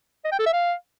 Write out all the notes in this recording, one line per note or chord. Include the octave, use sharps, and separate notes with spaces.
D#5
G5
A4
E5
F5